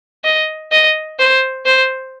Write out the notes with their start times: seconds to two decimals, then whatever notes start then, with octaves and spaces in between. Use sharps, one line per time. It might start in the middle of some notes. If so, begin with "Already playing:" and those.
0.24 D#5
0.72 D#5
1.19 C5
1.66 C5